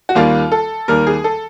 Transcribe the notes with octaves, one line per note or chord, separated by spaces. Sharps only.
F#4
D#2 D#3 G3 A#3 F4
A4
D#2 D#3 G3 A#3 A#4
G#4
A4